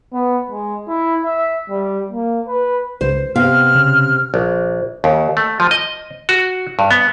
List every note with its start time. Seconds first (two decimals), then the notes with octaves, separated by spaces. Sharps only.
0.13 B3
0.50 G#3
0.88 E4
1.25 E5
1.70 G3
2.11 A#3
2.47 B4
3.01 C#2 C5
3.36 C3 B3 F5 F6
3.75 C#3
4.34 A#1
5.04 D#2
5.37 A3
5.60 F3
5.71 D#5
6.29 F#4
6.79 G2
6.91 B3